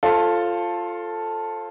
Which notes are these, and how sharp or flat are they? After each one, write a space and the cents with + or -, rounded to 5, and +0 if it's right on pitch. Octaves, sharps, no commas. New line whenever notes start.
F4 +0 A4 +0 C5 +35